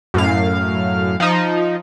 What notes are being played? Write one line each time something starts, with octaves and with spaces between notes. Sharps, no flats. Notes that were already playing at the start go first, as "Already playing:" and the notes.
F#2 A2 F5
F3 D#4